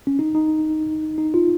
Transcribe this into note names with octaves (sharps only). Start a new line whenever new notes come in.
C#4
D#4
D#4
D#4
F4